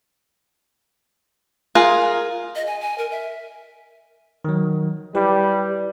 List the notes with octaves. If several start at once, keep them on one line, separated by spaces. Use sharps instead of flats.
F4 G#4 A#4
D#5
G#5
G#5
A#4
E5
D#3 F#3
G3 E4 G4 B4